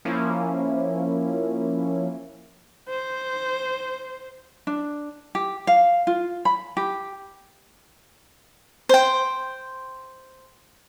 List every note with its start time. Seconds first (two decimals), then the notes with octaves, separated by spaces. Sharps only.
0.05 F3 A#3 C#4 E4
2.89 C5
4.67 D4
5.35 G4
5.67 F5
6.07 F4
6.45 B5
6.77 G4
8.89 C5 G5